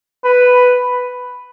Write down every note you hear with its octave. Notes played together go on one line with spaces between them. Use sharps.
B4